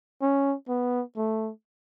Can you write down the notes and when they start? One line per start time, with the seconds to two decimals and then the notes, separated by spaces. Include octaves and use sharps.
0.21 C#4
0.69 B3
1.17 A3